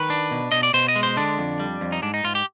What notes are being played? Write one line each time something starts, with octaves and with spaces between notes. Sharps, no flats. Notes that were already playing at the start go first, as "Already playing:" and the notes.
Already playing: D#3 B4
D4
B2
B2 D#5
D5
B2 C5
D#5
G#3
C5
D3 D4
F2
G3
F2
D#4
G#2 D4
D#4
G#2 F4
G4